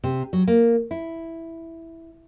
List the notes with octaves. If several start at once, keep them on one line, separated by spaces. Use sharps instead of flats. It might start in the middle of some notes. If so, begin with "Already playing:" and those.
C3
F#3
A#3
E4